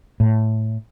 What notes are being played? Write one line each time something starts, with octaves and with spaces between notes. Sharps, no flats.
A2